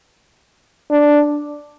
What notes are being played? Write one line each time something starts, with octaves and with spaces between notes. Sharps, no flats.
D4